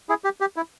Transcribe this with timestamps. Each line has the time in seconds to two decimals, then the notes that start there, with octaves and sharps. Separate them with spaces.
0.09 E4 G#4
0.24 G4
0.41 G4
0.56 E4